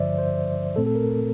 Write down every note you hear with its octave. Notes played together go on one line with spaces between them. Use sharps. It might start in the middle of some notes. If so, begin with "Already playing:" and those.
Already playing: G2 D3 F3 C5 D5 E5
C5
A#2 A3 C4 A4
A4
A#4